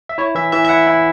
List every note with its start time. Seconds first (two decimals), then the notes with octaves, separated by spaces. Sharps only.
0.09 E5
0.18 E4 C#5
0.35 E3 E5
0.52 E3 E5
0.65 E5
0.69 E4 F#5
0.87 E4